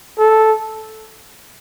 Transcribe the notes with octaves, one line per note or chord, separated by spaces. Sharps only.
A4